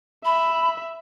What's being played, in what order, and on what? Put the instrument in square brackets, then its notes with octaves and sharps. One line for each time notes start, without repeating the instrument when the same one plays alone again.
[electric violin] E5 [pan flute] B5